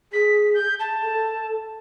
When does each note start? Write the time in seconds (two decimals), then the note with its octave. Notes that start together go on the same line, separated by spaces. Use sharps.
0.13 G#4 B6
0.54 G6
0.79 A5
1.02 A4